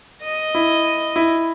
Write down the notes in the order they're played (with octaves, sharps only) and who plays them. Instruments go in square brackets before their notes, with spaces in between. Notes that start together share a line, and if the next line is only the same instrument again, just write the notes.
[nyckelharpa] D#5
[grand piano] E4
E4